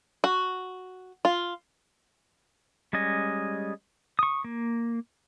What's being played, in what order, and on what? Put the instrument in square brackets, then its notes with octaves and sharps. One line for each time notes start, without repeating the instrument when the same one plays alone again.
[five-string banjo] F#4
F4
[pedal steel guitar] G3 G#3 C#4 D#5 G#5
C#6 D#6
A#3